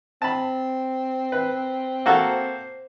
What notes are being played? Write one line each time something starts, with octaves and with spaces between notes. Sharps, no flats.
C4 A5 B5
B4
A#3 F#4 A4 C5